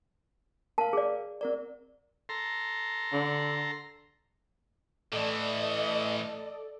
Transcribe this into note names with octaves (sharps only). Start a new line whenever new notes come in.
A#4 F5 A5
G#4 D5
C4 A#4 D5
A4 A#5 C6
D3
A2 E3 A3 A4 D5 D#5